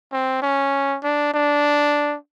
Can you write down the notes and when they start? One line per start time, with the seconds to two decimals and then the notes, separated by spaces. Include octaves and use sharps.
0.12 C4
0.42 C#4
1.03 D4
1.34 D4